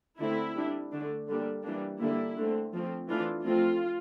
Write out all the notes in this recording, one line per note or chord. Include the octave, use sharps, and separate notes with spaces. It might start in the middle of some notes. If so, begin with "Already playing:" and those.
D3 A3 C4 E4
G3 D4
D3 A3 D4
D3 G3 A#3 D4
E3 G3 A#3 D4
D3 G3 A#3 D4 E4
D3 A3 C4
F3 A3 C4
E3 A3 D4 F4
F3 A3 C4 F4